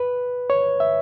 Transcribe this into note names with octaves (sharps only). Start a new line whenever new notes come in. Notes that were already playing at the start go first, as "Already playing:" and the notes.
Already playing: B4
C#5
E5